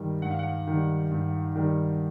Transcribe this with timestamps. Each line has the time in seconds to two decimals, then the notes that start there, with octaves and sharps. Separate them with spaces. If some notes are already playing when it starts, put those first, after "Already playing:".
Already playing: G2 D#3 G3
0.22 G2 F#5
0.31 F5
0.39 F#5
0.67 D#3 G3
1.11 G2
1.55 D#3 G3